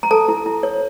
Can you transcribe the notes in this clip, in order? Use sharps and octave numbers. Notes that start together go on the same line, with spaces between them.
A#5
A4 A5
E4
E4
C#5